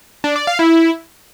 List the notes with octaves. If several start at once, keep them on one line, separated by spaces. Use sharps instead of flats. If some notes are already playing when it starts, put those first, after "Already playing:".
D4
D5
F5
E4